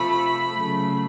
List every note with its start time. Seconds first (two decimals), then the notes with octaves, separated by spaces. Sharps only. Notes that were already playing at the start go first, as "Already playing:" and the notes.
Already playing: C3 F3 A3 B5
0.52 C#3 F#3 A3